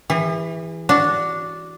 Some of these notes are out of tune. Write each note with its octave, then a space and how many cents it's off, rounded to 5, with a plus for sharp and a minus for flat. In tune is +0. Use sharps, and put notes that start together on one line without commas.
E3 +0 G#4 -45
D4 -5 F#4 +0